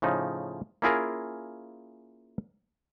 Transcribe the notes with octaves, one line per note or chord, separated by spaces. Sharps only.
A2 C#3 F3 D#4
A#3 C#4 E4 F4 G#4 A#4